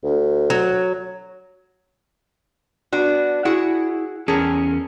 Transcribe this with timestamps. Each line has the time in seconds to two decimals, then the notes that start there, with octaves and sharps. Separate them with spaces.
0.04 D2
0.50 F#3
2.93 B3 D4 F#4
3.45 E4 F#4 G#4 F#5
4.28 E2 C#4 G#4 A#4 A5